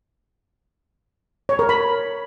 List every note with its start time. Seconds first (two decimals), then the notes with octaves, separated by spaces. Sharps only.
1.49 C#5
1.59 A#4
1.69 B5